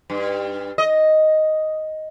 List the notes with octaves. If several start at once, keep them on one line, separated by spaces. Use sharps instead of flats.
G2
D#5